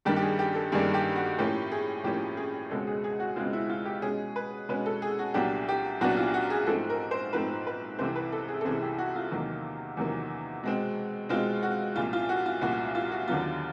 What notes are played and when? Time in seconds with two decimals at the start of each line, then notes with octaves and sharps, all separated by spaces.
0.05 G2 D#3 G3 A#3 D4 G4
0.16 G4
0.22 G#4
0.39 G4
0.55 A4
0.72 G2 D#3 G3 A#3 D4 G#4
0.94 G4
1.16 F#4
1.39 A2 F3 A#3 C#4 G4
1.72 G#4
2.04 A2 F3 A#3 C#4 G4
2.37 G#4
2.70 C#2 B2 G#3 C4 A4
2.87 G#4
3.04 G#4
3.20 F#4
3.36 C#2 B2 G#3 C4 F4
3.53 E4
3.69 F4
3.85 G4
4.02 B2 G#3 C#4 G#4
4.36 B4
4.69 B2 G#3 C#4 B4
4.86 A4
5.02 G#4
5.19 F#4
5.34 C2 A#2 F#3 B3 D4 G4
5.68 G4
6.01 C2 A#2 F#3 B3 D4 F#4
6.17 F4
6.34 F#4
6.50 G#4
6.67 G#2 F3 A3 C4 A4
6.90 A#4
7.11 C5
7.33 G#2 F3 A3 C4 B4
7.67 B4
7.99 C2 C3 E3 A3 C4 C5
8.16 B4
8.32 A4
8.48 G#4
8.61 A4
8.65 C2 C3 E3 A3 C4 G#4
8.82 G4
8.98 F#4
9.16 F4
9.31 E2 C3 D#3 F#3 A#3
9.97 E2 C3 D#3 F#3 A#3
10.63 B2 G#3 C4
11.29 B2 G#3 C4 F4
11.63 F#4
11.96 C2 A#2 F3 F4
12.13 F4
12.29 F#4
12.46 F4
12.61 C2 A#2 F3 F#4
12.95 F4
13.11 F#4
13.28 D#2 D3 F#3 B3 F4